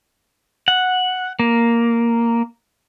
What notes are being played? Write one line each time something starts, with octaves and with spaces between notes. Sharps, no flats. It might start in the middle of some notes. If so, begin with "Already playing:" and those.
F#5
A#3